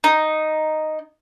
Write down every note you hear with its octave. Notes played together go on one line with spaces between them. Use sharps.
D#4